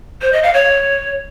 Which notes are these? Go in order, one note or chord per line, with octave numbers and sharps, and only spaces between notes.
C5
D#5
F5
C#5